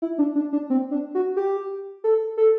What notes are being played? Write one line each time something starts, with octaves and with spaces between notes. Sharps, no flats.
E4
D4
D4
D4
C4
D4
F#4
G4
A4
A4